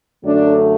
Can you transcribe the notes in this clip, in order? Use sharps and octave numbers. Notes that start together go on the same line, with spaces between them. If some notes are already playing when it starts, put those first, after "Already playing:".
F#2 D3 F#3 A3 D4